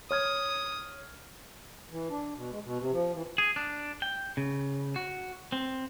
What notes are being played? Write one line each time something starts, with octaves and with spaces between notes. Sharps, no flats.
C#5 D#6 F6 G#6
E3
D4
B2
G#3
B2
C3
F3
E3
G#4
D4
G5
C#3
F#4
C4